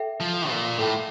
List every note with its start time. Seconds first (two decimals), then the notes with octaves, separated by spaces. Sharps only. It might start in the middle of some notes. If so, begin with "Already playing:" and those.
Already playing: A4 E5 G5
0.20 F3
0.50 A#2
0.79 A2 A4 E5 G5